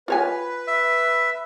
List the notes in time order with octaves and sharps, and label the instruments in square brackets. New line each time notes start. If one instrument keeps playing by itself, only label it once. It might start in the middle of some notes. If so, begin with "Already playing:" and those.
[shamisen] F4 C#5 G#5 [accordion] B4
[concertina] E5